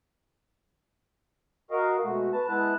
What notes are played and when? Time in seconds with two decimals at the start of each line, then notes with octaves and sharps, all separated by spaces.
1.71 F#4 A#4 D#5 F5
2.03 B2 G#3 A3 F#4
2.33 B4 A5
2.48 G#3 B3 E4 A5 F#6